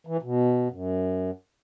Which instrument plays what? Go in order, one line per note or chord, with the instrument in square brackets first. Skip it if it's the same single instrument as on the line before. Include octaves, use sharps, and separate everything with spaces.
[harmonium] E3
B2
F#2